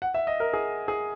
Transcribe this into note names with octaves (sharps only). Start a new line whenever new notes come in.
F#5
E5
D#5
A#4
G#4
G#4